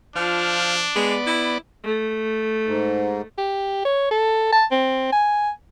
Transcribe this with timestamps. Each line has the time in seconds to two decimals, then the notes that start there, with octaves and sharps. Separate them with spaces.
0.16 F3 D4 F4
0.96 G#3 B3 D5
1.26 E4
1.84 A3
2.66 G#2
3.38 G4
3.85 C#5
4.11 A4
4.52 A5
4.71 C4
5.12 G#5